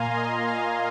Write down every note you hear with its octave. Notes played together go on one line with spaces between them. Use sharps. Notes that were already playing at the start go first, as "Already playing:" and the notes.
Already playing: A#2 A#3 F5 G#5 A#5 C6
D#5
F5